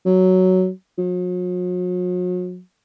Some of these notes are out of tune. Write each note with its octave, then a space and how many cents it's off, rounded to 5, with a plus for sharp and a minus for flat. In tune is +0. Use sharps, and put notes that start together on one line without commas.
F#3 +5
F#3 -45